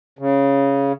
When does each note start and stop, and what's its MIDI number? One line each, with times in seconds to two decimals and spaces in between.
0.19 0.92 49